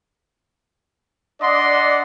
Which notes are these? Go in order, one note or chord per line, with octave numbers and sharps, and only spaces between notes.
D4 D5 D#5 F#5 C6